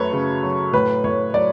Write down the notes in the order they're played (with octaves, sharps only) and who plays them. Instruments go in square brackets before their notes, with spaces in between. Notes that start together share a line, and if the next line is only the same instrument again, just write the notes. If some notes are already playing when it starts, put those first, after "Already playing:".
Already playing: [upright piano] F#2 A3 A4 B4 C#5
C#3
F#3
A2 B4
A2 C#5
F#3 D5